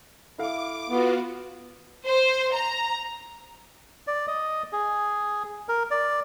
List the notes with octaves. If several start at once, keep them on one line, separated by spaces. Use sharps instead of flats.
E4 A4 F5 D6
B3 F4 F#4
C5
A#5
D5
D#5
G#4
A#4
D5